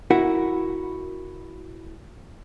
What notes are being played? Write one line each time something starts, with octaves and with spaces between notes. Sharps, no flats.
E4 F#4 A#4 F#5